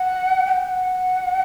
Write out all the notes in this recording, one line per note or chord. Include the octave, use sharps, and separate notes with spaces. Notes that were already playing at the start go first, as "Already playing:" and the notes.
Already playing: F#5
G5
F#5